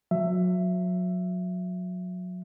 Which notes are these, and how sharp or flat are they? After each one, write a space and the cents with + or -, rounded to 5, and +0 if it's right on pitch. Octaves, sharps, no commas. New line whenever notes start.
F#3 -30 E5 +15